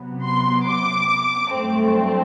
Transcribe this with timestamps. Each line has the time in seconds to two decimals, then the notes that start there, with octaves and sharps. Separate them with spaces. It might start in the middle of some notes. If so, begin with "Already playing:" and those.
Already playing: C3 F#3 B3
0.26 C6
0.68 D6
1.53 G2 F#3 A3 C4